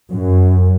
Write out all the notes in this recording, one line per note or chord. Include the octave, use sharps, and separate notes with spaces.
F#2